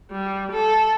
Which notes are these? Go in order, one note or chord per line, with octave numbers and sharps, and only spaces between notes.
G3
A4